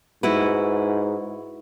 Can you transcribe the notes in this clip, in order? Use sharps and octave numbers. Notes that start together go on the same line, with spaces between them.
G#2 E4 F#4 B4